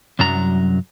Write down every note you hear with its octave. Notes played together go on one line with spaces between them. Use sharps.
C2 F#2 F#3 A#5